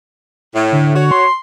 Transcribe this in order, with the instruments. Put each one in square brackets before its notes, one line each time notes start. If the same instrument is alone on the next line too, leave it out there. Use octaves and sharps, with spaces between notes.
[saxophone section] A2
[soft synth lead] D3
[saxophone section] F#4 C#5
[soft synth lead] C6